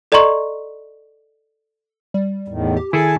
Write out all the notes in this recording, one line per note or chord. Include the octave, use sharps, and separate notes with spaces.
A4 D5 D#5 A#5 C6 C#6
G3
E2 A2 D#3
G4
D#3 E4 G#4 A4 G#5 A5